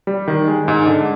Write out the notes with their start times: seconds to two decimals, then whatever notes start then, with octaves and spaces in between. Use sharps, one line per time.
0.07 G3
0.28 D#3
0.48 G#3
0.68 G#2
0.87 D3